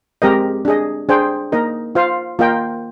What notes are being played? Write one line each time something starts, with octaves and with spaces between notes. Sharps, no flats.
G#3 C4 G4 A#4 D#5
D4 G#4 D#5
D4 G#4 C5 G5
A#3 D#4 A#4 D#5
F4 C5 F5
A#3 F4 A#4 D#5 G5